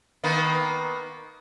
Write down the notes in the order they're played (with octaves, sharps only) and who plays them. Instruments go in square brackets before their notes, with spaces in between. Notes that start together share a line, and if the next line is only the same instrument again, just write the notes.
[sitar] D#3 A#3 B3